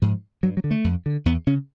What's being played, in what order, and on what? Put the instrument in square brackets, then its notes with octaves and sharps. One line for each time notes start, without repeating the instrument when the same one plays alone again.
[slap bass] G#2 F3
G2 F#3
F#3
D3
A3
F2
D3
E2 B3
C#3 C#4